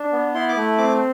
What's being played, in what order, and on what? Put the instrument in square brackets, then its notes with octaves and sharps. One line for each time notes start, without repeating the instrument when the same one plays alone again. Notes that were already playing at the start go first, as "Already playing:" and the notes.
Already playing: [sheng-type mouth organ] D4
B3
E4 C6
D6
A3
C4 D6